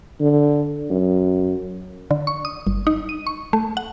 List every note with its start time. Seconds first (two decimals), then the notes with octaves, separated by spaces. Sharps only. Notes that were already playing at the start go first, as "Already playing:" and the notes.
0.20 D3
0.90 F#2
2.11 D3
2.27 C#6
2.45 D#6
2.67 G1
2.87 D#4
3.09 D#7
3.27 C#6
3.53 A3
3.77 F#5